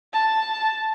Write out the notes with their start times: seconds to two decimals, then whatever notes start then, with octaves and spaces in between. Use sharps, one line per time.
0.13 A5